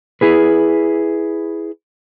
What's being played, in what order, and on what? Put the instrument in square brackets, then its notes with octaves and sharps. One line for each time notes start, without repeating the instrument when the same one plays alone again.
[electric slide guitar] E4 G#4 B4